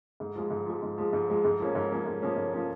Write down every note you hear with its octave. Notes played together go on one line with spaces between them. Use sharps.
G#2
F3 G#3
G#2
F3 G#3
G#2
F3 G#3
G#2
F3 G#3
G#2
F3 A#3 C#4
G#2
F3 A#3 C#4
G#2
F3 A#3 C#4
G#2
F3 A#3 C#4